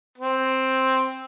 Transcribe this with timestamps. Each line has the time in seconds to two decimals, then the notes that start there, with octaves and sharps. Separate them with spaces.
0.18 C4